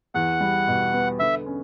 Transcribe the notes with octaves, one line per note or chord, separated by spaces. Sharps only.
E2 F#5
G3
B2
B3
D3 E5
C#4